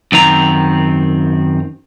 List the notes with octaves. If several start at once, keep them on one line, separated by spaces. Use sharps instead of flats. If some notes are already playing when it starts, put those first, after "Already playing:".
F#2 D#3 C4 A#5